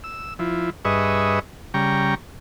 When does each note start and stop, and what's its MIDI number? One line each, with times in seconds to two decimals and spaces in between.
0.04 0.34 88
0.39 0.70 53
0.39 0.70 64
0.85 1.39 43
0.85 1.39 68
0.85 1.39 71
0.85 1.39 75
0.85 1.39 76
0.85 1.39 85
1.74 2.15 49
1.74 2.15 55
1.74 2.15 79
1.74 2.15 82
1.74 2.15 85